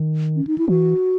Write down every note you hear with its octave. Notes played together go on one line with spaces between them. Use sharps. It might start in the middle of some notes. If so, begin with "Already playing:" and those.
Already playing: D#3
C#4
D#4
E4
E3 F#4